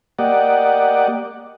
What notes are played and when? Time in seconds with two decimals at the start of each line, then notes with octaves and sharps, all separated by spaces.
0.19 A#3 G4 D5 D#5 F#5